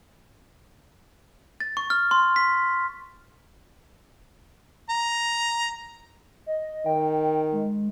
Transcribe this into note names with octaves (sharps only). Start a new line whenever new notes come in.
A6
C#6
F6
C6
B6
A#5
D#5
D#3 G5
G#3